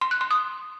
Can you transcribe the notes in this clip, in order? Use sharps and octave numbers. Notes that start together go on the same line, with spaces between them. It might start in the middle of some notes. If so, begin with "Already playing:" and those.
C6
F#6
C6
D#6